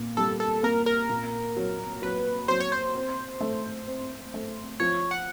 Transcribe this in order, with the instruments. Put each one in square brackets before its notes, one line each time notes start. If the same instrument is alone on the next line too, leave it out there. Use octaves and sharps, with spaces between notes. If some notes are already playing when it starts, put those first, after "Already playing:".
Already playing: [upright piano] A#2
[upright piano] G3 [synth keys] A4
[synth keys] A4
[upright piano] A#3 [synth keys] A#4
[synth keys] A#4
[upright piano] A#2
F#3
[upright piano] F#3 [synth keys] B4
[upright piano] F#3 [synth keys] C5
[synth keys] C#5
C5
[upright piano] C4
A3
C4
A3
[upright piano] F3 [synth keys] C#5
[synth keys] F#5